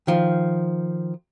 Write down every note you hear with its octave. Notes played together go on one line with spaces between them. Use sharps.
D#3 F3